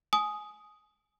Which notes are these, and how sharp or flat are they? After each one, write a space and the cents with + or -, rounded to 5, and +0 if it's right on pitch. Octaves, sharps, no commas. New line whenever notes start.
G#5 +20 D#6 +0